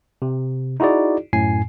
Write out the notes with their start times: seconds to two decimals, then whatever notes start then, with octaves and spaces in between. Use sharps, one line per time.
0.22 C3
0.80 D#4 E4 F#4 G#4 D5
1.33 F#2 A2 G#5 C7